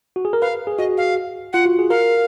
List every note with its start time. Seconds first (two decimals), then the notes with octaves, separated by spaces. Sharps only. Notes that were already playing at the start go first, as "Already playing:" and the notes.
0.16 F#4
0.25 G#4
0.33 A#4
0.42 B4 F5
0.67 G#4
0.78 F#4 D#5
0.98 F5
1.53 F4 F#5
1.66 F#4
1.79 G#4
1.90 A#4 F5